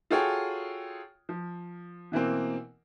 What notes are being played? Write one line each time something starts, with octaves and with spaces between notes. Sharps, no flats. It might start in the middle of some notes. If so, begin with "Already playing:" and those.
F4 F#4 G#4 A4 C#5 G5
F3
B2 E3 A#3 C4